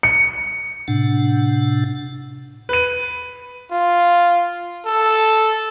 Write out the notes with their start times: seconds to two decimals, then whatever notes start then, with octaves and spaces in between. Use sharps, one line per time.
0.03 C#7
0.88 A2 C3 D4 F#5
2.69 B4 D#7
3.71 F4
4.86 A4